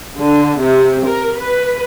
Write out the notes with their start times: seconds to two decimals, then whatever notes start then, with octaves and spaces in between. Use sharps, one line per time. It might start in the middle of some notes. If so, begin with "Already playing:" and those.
0.17 D3
0.60 C3
1.07 A#4
1.40 B4